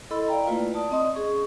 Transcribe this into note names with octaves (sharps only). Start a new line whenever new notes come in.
E4 A4 D#5 B5 C6 E6
D5 F5 G5 A#5
A3 A#3 E4 F4 B4
D5 A5 D#6
C4 D#5 C6 D#6
C#4 G#4 C#6